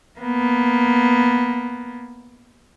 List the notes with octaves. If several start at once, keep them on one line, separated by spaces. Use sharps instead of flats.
A#3 B3